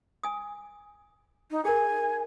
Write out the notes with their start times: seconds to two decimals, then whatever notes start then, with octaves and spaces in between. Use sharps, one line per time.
0.23 G#5 D#6
1.51 D#4
1.65 G#4 A#4 G#5